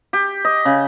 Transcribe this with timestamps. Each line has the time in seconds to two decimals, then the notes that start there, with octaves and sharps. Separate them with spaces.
0.13 G4
0.45 D#5
0.65 C#3